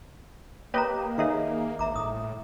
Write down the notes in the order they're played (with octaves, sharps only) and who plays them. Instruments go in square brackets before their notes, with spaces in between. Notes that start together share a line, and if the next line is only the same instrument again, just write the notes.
[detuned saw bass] A#3 [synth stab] G4 B4 D#5 [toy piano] C#5 A#5
[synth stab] D#3 D#4 G#4 [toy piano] C#5 E5 F5
[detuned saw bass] G#1 [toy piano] E5 A#5 D6
[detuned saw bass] A2 [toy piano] D#6